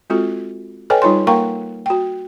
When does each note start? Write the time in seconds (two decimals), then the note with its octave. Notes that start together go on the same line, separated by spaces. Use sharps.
0.10 G#3 C4 F4 F#4 A4
0.90 A4 B4 C#5 D#5 G5 G#5
1.02 G3 D#4 F4 C#5 C6
1.27 A#3 A#4 F5 G5 A#5 C#6
1.86 F#4 G5